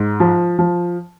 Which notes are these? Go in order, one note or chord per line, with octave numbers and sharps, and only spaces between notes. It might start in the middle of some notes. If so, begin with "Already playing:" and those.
Already playing: G#2
F3
F3